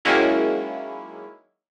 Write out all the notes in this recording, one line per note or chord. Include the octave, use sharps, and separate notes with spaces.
D#3 F#3 G#3 A#3 C#4 E4